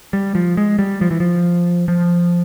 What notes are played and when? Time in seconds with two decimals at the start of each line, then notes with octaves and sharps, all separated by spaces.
0.13 G3
0.35 F3
0.57 G#3
0.79 G3
1.01 F3
1.11 E3
1.20 F3
1.88 F3